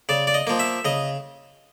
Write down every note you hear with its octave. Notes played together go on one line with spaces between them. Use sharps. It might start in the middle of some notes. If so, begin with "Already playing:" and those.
C#3 D5
D5
D#5
F3 A#3
E5
C#3 D#5